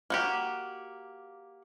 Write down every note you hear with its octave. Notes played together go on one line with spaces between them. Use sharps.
A#3 F#4 G4